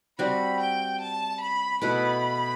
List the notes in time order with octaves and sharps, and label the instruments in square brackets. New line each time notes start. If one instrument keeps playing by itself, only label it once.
[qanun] G3 C4 F#4 [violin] B5
[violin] G5
A5
B5
[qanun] B2 A3 E4 B4 [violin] B5